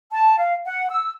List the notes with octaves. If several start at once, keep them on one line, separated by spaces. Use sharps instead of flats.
A5
F5
F#5
E6